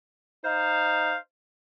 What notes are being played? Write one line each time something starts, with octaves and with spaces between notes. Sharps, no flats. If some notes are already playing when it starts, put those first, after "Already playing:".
D#4 C5 F5